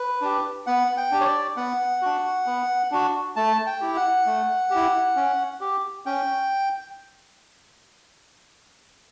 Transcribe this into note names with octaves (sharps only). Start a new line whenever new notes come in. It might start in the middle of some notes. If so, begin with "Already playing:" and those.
Already playing: B4
D4 G4
B3 F#5
G5
D4 G4
C#5
D5
B3 F#5
D4 F#4
B3
D4 F#4
A3 A5
G5
E4 G4
F#5
A3
E4 G4
C#4
G4
C#4 G5